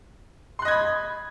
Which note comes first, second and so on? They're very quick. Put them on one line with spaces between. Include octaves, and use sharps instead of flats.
C6 F#6 D#5 G#6 B5